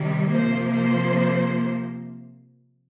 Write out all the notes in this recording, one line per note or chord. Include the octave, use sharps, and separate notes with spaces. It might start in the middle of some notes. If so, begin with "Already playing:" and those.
Already playing: C3 D#3 G3
C3 F3 A#3 C5
C5